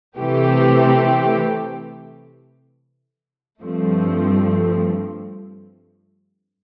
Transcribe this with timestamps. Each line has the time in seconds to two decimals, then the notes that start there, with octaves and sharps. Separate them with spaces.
0.17 C3 E3 A3 C4 G4
3.62 G2 F3 A3 C4